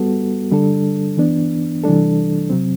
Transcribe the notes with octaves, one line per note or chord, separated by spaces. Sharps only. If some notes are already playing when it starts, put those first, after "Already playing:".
Already playing: G3 B3 F#4 A4
D3 G3 D4 A4
E3 B3 D4
C3 E3 G3 D4 A4
C3 F#3 C4